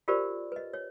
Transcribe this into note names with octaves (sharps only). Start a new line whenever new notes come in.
F4 G4 A#4 C5 D5
B4 D#5
C#5